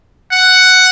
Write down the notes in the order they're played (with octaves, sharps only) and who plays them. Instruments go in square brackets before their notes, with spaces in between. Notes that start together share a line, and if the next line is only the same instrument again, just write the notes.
[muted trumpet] F#5